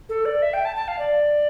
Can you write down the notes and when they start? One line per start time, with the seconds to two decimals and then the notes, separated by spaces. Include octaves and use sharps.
0.09 A4
0.25 D5
0.42 E5
0.53 G5
0.65 A5
0.76 A5
0.88 F5
0.99 D5